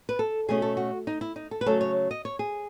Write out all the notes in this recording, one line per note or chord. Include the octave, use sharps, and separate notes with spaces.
B4
A4
B2 A3 C#4 G#4
A4
F#4
D#4
E4
D#4
A4
B4
C#3 F#3 A3 C#4 A4
C#5
D#5
C#5
G#4